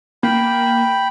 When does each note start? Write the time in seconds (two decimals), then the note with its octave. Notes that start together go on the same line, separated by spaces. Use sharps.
0.23 A#3 G5 B5